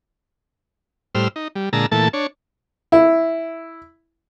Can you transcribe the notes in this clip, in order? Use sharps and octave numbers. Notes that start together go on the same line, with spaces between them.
A2 G3 C5 E6 F6
D#4
G3
A#2 D3 G#3 A5 A#5 E6
A#2 E3 A3 A4 A5
D4 C#5
E4